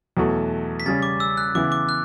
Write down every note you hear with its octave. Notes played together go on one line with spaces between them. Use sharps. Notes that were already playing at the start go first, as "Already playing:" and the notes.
E2 B2 F#3 A3
B6
C#3 G3 C#4 A6
D6
E6
F#6
C#3 E3 B3 E4 D6
D6
F#6